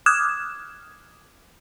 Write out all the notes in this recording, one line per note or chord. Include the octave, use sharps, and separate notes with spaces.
D6 D#6 F6 F#6 G#6 E7